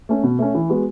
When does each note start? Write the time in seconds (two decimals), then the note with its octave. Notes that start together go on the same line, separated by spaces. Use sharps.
0.09 A3 C#4
0.24 B2
0.39 A3 C#4
0.55 E3
0.69 G#3 B3 F#4